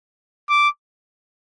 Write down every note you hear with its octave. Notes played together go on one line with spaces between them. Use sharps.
D6